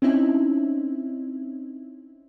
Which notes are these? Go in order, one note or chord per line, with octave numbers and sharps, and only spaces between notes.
C4 C#4 D#4 E4